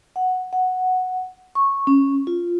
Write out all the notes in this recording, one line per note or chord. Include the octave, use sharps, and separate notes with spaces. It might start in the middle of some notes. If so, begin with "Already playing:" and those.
F#5
F#5
C#6
C#4
F4